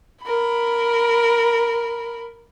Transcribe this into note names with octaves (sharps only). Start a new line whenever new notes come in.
A#4 B5